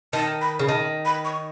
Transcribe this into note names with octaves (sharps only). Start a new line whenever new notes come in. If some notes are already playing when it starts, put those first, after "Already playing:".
D#3 A5
B5
C#3
D#3 A5
B5
C#6